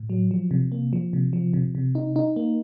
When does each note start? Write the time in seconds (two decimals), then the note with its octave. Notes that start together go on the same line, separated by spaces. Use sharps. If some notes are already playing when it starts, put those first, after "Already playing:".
Already playing: A2
0.10 F#3
0.31 F3
0.51 C3
0.72 A#3
0.93 F3
1.13 C3
1.33 F3
1.53 C3
1.75 C3
1.95 D#4
2.16 D#4
2.36 A#3